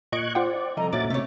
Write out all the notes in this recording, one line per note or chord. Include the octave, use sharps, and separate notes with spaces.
A#2 D#5 C#6 F#6 G#6 D7
F4 C5 D5 F#5 G5
C2 F2 A4 D#5 A#5
A#2 C#4 F#4 E5 D6 A6
C3 A3 C#5 A6